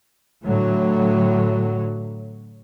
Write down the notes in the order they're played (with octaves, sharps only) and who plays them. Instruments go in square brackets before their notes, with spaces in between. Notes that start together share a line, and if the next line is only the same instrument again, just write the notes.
[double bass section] A2 D3 F#3